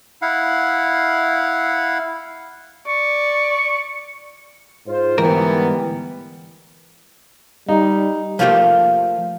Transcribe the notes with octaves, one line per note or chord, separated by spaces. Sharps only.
E4 F5 F#5
D5 C#6
G#2 F4 C5
D2 G#2 E3 G3 B3 A#4
G3 D#4
F3 A3 A#3 F4 G4 C5